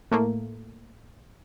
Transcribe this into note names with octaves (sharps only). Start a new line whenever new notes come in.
A2 A3 A#3